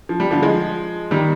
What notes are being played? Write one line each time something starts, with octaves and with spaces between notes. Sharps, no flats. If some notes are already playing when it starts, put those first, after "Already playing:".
F3
G3
D3 F3
F3 G#3
D#3 G3